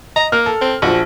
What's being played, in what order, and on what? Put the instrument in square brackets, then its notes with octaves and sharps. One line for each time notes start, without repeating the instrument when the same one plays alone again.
[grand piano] D#5 [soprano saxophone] A#5
[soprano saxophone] A#3 [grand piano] F6
[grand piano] A4
[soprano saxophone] C4
[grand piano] A#1 F3 [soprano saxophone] F#4